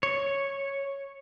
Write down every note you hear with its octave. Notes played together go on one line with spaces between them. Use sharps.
C#5